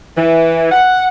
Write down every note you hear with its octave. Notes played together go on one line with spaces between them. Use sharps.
E3
F#5